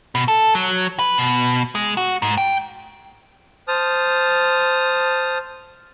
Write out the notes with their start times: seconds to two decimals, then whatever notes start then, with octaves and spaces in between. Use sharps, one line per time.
0.15 B2
0.28 A4
0.55 F#3
0.99 B4
1.18 B2
1.75 G#3
1.97 F#4
2.22 G#2
2.38 G5
3.68 C5 A5 D#6 F6